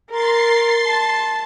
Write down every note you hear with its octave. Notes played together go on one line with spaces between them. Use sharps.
A#4 C6 A6 C7
A5